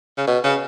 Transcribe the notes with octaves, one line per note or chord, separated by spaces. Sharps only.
C#3
B2
C#3